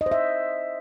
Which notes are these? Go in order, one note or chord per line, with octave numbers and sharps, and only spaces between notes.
D#5
C5
E5